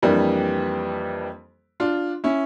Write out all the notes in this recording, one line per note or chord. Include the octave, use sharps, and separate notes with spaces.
F2 E3 G3 A#3 D4
D4 F4
C#4 E4